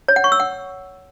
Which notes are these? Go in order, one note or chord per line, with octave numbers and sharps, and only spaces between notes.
C#5
F#5
C#6
E6
F#5